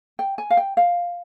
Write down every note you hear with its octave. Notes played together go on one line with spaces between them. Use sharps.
G5
G#5
F5
G5
F5